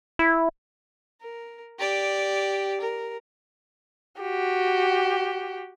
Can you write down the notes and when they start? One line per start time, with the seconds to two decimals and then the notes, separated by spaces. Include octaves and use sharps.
0.19 E4
1.21 A#4
1.79 G4 D5
2.81 A#4
4.21 F#4 G4